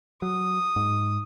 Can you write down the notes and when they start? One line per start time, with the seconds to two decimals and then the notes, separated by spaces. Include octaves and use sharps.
0.22 F#3 D#6
0.76 G#2